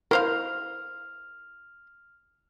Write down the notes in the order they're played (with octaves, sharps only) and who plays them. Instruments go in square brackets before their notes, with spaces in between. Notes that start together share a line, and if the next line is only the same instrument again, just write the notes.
[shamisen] E4 C5 F5 [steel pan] A#4 [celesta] F6 F7